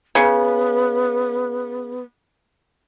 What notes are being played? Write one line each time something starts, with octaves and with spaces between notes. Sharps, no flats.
C#3 B3